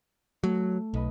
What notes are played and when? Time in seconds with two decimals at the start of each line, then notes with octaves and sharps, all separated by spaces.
0.44 F#3 A3
0.94 B1 B4 D#5 B5